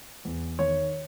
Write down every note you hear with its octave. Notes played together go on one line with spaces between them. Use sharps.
E2
D#3 C#5